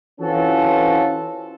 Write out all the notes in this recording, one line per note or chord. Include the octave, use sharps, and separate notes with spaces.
E3 C4 C#4 F4 F#4 A4